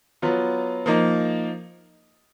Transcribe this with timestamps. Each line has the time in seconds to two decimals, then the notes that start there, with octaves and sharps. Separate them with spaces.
0.22 F#3 B3 F4
0.86 F3 A#3 D#4